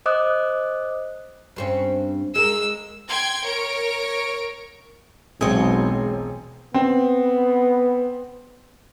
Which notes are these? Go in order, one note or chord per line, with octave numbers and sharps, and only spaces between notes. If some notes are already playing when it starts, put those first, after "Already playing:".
C5 D#5 D6 D#6 F#6
G2 C4 C#4
G#3 A#4 E6
G5 C6 G#6
A#4 C#5 D7
E1 B1 G#3 C4 F4 C#5 G#5 D#6
B3 C4